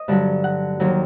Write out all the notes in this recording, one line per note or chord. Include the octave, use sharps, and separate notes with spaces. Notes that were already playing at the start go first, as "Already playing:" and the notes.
Already playing: D#5
G2 D3 F#3
F#5
D#2 D#3 F#3